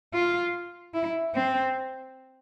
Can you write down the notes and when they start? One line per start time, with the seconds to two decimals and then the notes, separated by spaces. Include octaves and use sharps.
0.14 F4
0.94 E4
1.35 C4